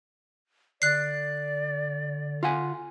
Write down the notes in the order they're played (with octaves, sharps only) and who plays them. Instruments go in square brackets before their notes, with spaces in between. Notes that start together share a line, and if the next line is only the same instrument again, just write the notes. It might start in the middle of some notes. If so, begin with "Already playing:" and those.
[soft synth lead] D3 [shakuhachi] D5 [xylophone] F#6 C7
[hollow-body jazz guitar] F4 F#5 G#5